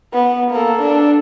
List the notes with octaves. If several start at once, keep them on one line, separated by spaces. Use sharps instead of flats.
B3
A#3 A4
D4 A4